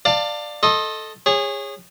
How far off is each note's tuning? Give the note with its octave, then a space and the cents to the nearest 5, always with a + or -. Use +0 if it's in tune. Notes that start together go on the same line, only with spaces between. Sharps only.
D5 +15 F5 +0 A5 +30
A4 +0 D#5 +0 C6 +40
G#4 -25 C#5 -10